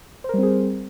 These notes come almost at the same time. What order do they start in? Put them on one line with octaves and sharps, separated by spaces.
C5 A#4 G3 C4 G#4